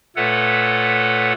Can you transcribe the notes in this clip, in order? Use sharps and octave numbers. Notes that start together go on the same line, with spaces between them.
A#2 A3 A4 B4 C#5 F#5